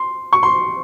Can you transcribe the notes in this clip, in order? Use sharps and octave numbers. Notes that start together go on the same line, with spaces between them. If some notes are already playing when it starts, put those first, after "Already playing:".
Already playing: C6
C#6
C6